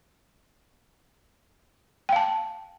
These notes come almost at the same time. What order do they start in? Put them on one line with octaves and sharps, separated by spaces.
G5 F5 A5